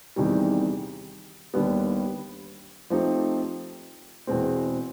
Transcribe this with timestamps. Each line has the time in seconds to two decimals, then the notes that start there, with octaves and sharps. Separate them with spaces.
0.16 E2 C3 D#3 G3
1.54 D#2 D3 G3 B3
2.90 F3 A3 C4 D#4 G4
4.27 E2 B2 G#3 C4